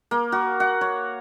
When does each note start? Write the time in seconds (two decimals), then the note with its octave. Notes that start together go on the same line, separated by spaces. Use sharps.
0.11 A#3
0.32 F#4
0.60 F#5
0.81 C#5